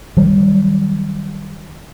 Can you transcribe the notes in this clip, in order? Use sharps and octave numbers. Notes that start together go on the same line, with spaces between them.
D#3 F#3 G3